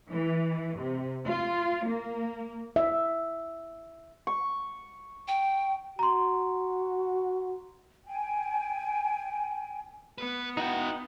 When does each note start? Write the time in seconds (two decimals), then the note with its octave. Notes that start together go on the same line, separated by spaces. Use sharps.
0.11 E3
0.79 C3
1.27 F4
1.89 A#3
2.76 E5
4.27 C#6
5.28 G5
5.99 F#4 A#5 C6
8.06 G5 G#5
10.18 B3 B4
10.57 D#4 E4 F#4 F#5 G5